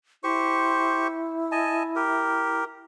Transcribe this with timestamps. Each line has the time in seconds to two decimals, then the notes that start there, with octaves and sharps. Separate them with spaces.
0.24 E4 G4 C5 C#6
1.52 D#5 G#5 A5
1.96 G4 A#4